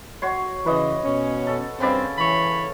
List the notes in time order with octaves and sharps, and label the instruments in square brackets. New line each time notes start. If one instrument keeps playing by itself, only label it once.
[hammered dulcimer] F#4 C#5 C6
[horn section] C#3 E3 [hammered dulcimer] B4 D#5
[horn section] B2 C#4
[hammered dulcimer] A4
[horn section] G2 C4 [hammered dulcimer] C#3 B4 D5
[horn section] E3 C#5 B5